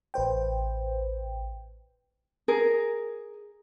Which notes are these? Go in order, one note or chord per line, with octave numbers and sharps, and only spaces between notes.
A1 B4 C5 G5
G#4 A#4